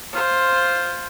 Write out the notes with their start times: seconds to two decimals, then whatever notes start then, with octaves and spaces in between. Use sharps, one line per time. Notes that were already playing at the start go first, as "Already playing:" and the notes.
0.13 F4 C5